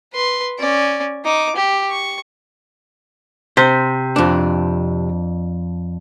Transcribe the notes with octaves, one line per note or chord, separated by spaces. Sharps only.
B4 C6
C#4 D5
D#4 D6
G4
C#6
C3 C5
F2 D4